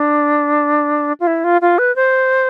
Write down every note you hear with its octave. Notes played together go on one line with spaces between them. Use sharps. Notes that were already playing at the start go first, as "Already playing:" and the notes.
Already playing: D4
F4
E4
F4
F4
B4
C5